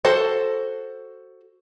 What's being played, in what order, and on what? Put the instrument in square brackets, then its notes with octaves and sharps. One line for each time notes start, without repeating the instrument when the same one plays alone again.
[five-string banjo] F#4 A4 C5